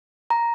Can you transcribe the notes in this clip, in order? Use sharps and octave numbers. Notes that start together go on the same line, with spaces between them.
A#5